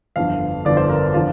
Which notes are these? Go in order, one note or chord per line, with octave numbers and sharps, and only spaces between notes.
G1 F2 D3 F5
G1 F2 D3 D5
C5
A#4
D3 F3 F4